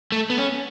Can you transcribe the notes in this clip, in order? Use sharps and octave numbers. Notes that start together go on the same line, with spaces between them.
A3
B3
C#4